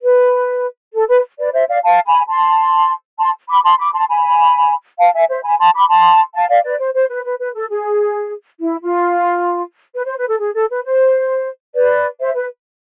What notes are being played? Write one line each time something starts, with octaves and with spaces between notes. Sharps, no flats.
B4
A4
B4
B4 D5
C5 E5
D5 F5
F5 A5
G#5 B5
A5 C6
A5 C6
B5 D6
A5 C6
B5 D6
A5 C6
G#5 B5
F5 A5
E5 G#5
C5 E5
G#5 B5
A5 C6
B5 D6
A5 C6
F5 A5
D5 F5
B4 D5
C5
C5
B4
B4
B4
A4
G#4
E4
F4
B4
C5
B4
A4
G#4
A4
B4
C5
B4 D5
C5 E5
B4